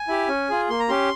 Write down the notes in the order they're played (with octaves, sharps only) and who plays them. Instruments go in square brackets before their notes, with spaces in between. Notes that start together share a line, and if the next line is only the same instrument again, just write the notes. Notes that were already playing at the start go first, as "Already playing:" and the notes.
Already playing: [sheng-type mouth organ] G#5
E4 G4
C#4
F4 G#4
A#3 C6
A#5
C#4 G4 C6